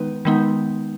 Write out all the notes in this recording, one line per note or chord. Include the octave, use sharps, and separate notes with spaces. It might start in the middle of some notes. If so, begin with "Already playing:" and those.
Already playing: D#3 G#3 B3 D#4 B4
D#3 G#3 B3 D#4